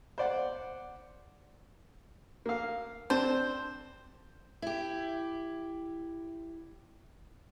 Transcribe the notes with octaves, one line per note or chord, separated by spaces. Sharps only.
C5 D5 F#5
A#3 F5
C4 D4 C5 A5
E4 G4